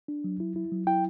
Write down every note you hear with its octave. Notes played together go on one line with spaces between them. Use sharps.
D4
F#3
E4
E4
F#3
E4 G5